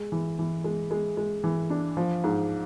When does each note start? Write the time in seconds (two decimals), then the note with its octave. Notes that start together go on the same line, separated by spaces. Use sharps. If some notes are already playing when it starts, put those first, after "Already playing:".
Already playing: G#3
0.12 E3
0.39 E3
0.64 G#3
0.91 G#3
1.17 G#3
1.44 E3
1.70 D4
1.97 F3
2.24 G#2